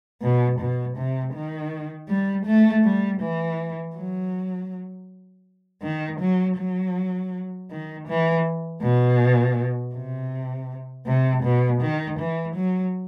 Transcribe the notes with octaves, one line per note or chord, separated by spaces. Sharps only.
B2
B2
C3
D#3
G3
A3
G3
E3
F#3
D#3
F#3
F#3
D#3
E3
B2
C3
C3
B2
D#3
E3
F#3